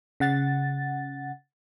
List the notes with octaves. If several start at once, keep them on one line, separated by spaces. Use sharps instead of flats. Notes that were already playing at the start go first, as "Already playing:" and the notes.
C#3 F#5 A6